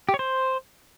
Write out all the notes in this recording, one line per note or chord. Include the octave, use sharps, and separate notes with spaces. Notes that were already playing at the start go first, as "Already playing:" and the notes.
G4
C#5
C5